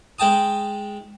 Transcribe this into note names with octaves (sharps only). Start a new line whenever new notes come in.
G#3 G5 A5 D#6